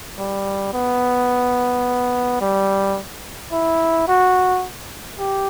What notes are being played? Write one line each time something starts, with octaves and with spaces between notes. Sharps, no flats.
G3
B3
G3
E4
F#4
G4